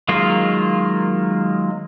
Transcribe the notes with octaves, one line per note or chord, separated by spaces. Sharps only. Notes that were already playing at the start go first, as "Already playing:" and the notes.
D#3 F#3 G#3 A#3 F4